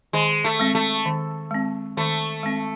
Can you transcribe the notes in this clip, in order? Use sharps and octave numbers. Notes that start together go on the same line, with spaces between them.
D#3 G#3
A3
G#3 C4
A3
D#3
G#3 C4
D#3 A3
G#3 C4